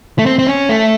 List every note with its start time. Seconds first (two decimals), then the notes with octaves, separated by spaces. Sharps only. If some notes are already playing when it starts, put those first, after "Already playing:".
0.19 A3
0.26 C4
0.39 C4
0.47 C#4
0.69 A3